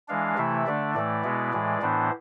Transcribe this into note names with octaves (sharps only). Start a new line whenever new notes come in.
E3 G#3 D4 F5
C3 E3 A3 E4 E5
D3 A3 D4 D5
A2 E3 A3 D5
B2 G#3 B3 E4
A2 E3 G#3
A2 E3 B3 D4 C5